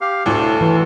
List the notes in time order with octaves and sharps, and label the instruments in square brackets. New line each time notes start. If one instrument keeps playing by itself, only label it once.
[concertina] G4 F5
[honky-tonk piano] D2 A2 [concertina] A4
[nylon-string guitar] E3